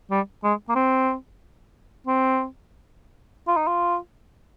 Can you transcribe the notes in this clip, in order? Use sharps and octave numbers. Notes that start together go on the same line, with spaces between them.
G3
G#3
A#3
C4
C4
F4
D#4
F4